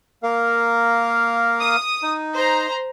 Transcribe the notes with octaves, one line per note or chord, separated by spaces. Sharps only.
A#3 A#4 F5
D#6
D#4
C5 A#5